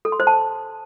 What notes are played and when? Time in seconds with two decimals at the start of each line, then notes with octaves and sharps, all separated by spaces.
0.05 A4
0.12 C6
0.20 C5
0.27 A5